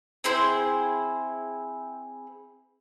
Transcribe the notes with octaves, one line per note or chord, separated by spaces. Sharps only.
C4 E4 G#4 C5